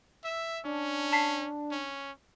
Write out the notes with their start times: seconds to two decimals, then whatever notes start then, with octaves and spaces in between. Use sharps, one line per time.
0.24 E5 E6
0.65 C#4 D4
1.12 A5 B6 C7
1.71 C#4